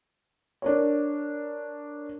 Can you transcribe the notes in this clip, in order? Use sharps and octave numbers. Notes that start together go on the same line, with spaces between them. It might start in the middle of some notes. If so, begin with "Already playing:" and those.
D4 A#4 C#5